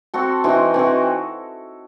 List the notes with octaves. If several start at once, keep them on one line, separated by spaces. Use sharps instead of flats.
C4 F#4 A4
E3 C4 D#4 F#4
E3 C4 D#4 F#4